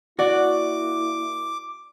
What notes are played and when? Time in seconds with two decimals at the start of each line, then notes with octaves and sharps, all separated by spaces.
0.19 A#3 E4 F#4 D5 F#5 D6